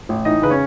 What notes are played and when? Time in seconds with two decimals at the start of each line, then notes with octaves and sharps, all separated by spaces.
0.09 A1
0.25 E3 D#4 D#5
0.42 C#3 B4
0.50 C#4 C#5